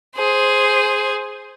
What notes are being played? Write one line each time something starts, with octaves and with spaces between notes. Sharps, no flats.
G#4 C5